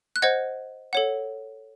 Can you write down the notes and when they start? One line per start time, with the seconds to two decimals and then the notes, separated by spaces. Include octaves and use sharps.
0.16 F#6
0.22 C5 D#5 F#5 G#6
0.93 A4 C#5 F#5